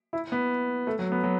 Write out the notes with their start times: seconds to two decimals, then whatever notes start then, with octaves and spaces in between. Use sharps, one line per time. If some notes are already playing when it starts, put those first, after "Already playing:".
0.13 E4
0.32 B3
0.87 A3
0.99 F#3
1.12 B3
1.24 F#3